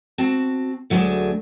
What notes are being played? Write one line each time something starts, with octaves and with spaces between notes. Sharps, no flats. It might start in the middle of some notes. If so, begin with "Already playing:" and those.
C4 F#4 A5
D2 F#3 A3 D4 G#4